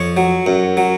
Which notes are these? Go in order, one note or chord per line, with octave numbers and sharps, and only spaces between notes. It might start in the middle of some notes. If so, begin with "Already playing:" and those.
Already playing: F2 C#5 C#6
F#3
F#2
F#3